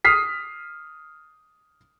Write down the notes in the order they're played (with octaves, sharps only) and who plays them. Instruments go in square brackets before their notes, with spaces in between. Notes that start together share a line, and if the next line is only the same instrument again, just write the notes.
[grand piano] D#6 F6 B6 C7